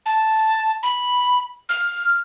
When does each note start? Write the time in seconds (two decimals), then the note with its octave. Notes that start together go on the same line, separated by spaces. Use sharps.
0.06 A5
0.83 B5
1.69 F6